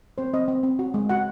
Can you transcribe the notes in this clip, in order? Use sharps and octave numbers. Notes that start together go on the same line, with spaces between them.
C4 C5
C4 D#5
C4
C4
F#4
G#3
F#4 F#5